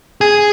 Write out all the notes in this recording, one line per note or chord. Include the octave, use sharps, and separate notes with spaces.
G#4